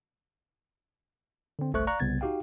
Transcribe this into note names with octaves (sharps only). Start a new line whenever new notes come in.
D3 C4
G1 C2 A3 C5 C#6 F#6
D5 F5 A#5 C#6 F#6
C2 C#3 B3 G#6 A6
D#4 F#4 G4 F5 G5